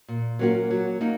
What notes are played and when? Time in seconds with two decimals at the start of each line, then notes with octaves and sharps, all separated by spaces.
0.08 A#2
0.39 F#3 A#3 C#4 F#4
0.70 F#3
1.01 A#3 D#4